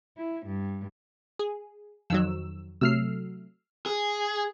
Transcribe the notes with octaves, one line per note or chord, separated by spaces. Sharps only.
E4
G2
G#4
F2 D#3 F#3 E6
C3 F#3 A3 E6 F6 C7
G#4